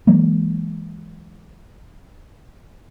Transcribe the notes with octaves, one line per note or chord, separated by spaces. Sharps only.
E3 F#3 G#3 A#3